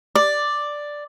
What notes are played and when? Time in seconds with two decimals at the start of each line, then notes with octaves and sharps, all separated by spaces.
0.15 D5